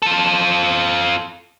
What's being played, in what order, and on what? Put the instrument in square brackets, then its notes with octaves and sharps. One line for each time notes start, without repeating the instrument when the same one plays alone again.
[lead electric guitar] F4 A4